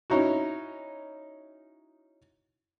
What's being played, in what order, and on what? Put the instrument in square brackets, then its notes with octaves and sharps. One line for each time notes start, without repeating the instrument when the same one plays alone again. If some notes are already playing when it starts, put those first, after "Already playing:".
[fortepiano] C#4 D#4 E4 F#4